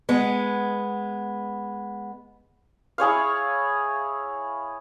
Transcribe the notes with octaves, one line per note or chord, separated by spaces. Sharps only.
G#3 B3
E4 G#4 C#5 F5